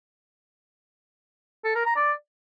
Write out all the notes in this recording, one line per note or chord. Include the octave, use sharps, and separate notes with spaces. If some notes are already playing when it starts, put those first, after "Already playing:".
A4
A#4
A#5
D5